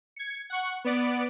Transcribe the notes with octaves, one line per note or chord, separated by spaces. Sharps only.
G#6 C#7
F#5 C#6
B3 D5 D7